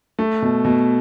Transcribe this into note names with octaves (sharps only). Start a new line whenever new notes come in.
A3
B2
B2